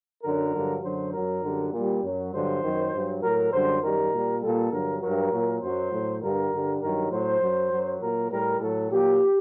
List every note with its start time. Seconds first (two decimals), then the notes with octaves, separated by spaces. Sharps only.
0.23 F#2 D3 F#3 A#4
0.53 G2 D3 F#3
0.83 F#2 D3 F#3 C5
1.13 F#2 F#3 A#4
1.43 F#2 D3 G3
1.73 A#2 G3
2.03 F#2 F#3
2.33 G2 D3 F#3 C5
2.63 F#2 D#3 F#3
2.93 G2 F#3
3.23 A2 F#3 A#4
3.52 F#2 D3 G3 C5
3.82 F#2 D#3 G3 A#4
4.13 A#2 G3
4.42 A#2 G3 A4
4.72 G2 D3 F#3 A#4
5.02 G2 F#3 A#4
5.32 A#2 F#3
5.61 F#2 F#3 C5
5.91 A2 F#3
6.21 G2 D3 G3 A#4
6.52 G2 D3 G3
6.81 G2 D#3 F#3 A#4
7.11 A2 F#3 C5
7.40 F#2 F#3
7.71 F#2 F#3
8.00 A#2 F#3 A#4
8.30 A2 G3 A#4
8.60 A2 F#3 A4
8.90 A#2 F#3 G4